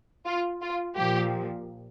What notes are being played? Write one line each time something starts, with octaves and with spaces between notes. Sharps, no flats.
F4
F4
A#2 F3 G4